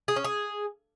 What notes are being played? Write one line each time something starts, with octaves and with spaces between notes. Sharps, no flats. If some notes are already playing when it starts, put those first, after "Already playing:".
G#4
C#4
G#4